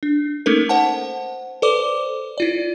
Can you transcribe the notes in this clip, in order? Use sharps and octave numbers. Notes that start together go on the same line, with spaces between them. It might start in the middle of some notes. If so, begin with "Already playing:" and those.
D4
A3 A#3 C#4 D#4 A4 A#4
C5 F#5 A5
A4 B4 C5 D5 D6
E4 F4 D5